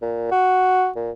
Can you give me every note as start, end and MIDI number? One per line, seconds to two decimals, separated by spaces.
0.02 0.30 46
0.31 0.89 66
0.96 1.11 46